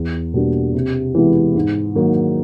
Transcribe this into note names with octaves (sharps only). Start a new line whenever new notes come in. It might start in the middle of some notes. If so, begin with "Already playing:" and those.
Already playing: E2
B2 G3 A#3 D4
C3
E3 G#3 B3 E4
G#2
D#3 F#3 A#3 D#4